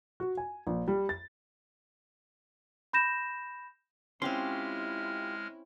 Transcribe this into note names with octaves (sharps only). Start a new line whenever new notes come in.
F#4
G#5
A#1
G3
A6
B5 G6 A#6 E7
G#3 C4 C#4 E4 F4 G4 C6 F6